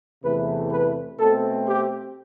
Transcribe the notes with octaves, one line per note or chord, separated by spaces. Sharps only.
E2 C3 E3 A3 C4 B4
B4
B2 A3 C4 A4
G4